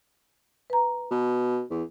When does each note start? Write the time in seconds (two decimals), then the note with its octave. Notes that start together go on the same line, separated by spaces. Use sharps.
0.70 B4 A#5
1.11 B2
1.71 E2